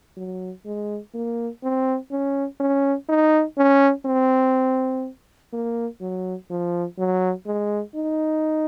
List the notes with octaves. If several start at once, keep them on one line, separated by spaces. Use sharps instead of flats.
F#3
G#3
A#3
C4
C#4
C#4
D#4
C#4
C4
A#3
F#3
F3
F#3
G#3
D#4